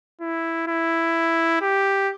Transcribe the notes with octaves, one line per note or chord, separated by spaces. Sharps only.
E4
E4
G4